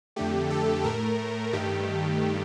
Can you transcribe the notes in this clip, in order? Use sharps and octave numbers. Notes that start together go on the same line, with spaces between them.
F2 D3 A3 G4
A4
A2 A3 A#4
G2 D#3 A3 G4